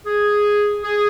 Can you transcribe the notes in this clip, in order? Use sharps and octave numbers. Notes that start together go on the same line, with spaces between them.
G#4
G#4